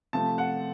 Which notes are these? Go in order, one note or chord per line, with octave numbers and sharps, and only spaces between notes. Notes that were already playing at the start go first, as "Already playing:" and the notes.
C3 F3 A3 A5
F#5